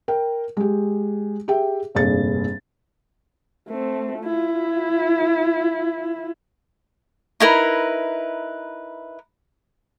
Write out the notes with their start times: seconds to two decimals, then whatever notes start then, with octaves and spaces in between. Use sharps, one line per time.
0.08 A#4 G5
0.57 G#3 G4
1.48 G4 G#4 E5 G5
1.95 F1 A#1 G2 G#4 A6
3.68 A3 C4
4.22 E4 F4
7.40 D#4 E4 A#4 B4